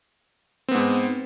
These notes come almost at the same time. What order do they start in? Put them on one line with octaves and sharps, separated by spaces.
C4 B3 G#2